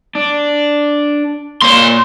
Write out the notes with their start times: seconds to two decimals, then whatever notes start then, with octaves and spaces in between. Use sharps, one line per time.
0.15 D4
1.62 A#2 A#3 C#5 C6